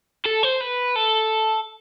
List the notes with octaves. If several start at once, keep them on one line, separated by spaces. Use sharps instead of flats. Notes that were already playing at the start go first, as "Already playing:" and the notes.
A4
C5
B4
A4